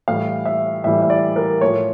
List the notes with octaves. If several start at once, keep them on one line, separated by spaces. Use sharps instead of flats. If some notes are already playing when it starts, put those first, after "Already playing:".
A2 E3 G3 F5
E5
A2 E3 G3 E5
E5
D5
A#4
A2 F3 C#5